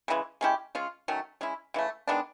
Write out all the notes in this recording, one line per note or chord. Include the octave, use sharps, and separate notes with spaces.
C#3 E3 G#3
G#3 C#4 E4 G4
G#3 C#4 F4
D#3 F#3 A3 C#4
G#3 C#4 E4
C#3 E3 A3
D#3 G#3 B3 D4